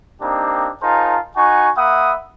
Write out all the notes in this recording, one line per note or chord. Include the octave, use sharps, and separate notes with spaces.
A#3 C4 D4 D#4 G4
D#4 F4 G#4 A#4 C5 A5
D#4 F#4 F#5 G#5 C#6
A#3 E5 F#5 B5 D#6